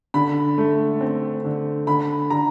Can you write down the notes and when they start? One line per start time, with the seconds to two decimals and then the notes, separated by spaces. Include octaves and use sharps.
0.14 D3 B5
0.58 A3
1.01 C4
1.45 D3
1.87 D3 B5
2.30 D3 A#5